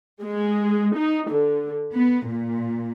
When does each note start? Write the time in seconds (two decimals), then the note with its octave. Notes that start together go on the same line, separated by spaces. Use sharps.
0.22 G#3
0.96 D#4
1.29 D3
1.94 B3
2.27 A#2